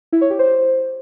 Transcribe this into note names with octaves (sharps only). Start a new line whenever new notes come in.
E4
C#5
G4
C5